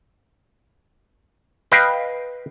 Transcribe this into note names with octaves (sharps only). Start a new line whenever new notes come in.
B4 D#5 F5 G5